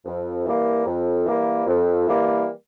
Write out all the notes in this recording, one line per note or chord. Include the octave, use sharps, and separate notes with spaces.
F2
E3 G3 A#3
F2
E3 G3 A#3
F2
E3 G3 A#3